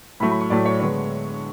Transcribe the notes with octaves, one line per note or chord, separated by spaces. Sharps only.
A2 F#3 A3 B5
B5
C#6
A2 F#3 A3 D5
C#5
D3 G#3 B3 C#5